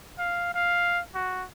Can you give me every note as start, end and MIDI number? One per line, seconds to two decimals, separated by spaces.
0.19 0.50 77
0.55 1.01 77
1.15 1.44 66